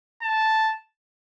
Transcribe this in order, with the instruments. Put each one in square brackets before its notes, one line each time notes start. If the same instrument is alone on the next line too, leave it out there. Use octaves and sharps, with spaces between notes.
[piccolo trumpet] A5